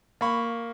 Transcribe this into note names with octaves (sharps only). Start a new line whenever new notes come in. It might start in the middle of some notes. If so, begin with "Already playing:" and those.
A#3 B5 C#6